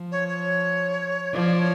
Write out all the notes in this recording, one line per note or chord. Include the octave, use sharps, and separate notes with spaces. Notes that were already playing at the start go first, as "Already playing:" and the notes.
Already playing: F3
C#5
C#5
F3 D5
C#5